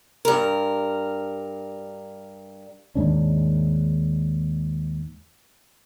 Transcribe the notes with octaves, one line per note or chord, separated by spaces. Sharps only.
G2 A#4
D#2 G#2 C#4 D4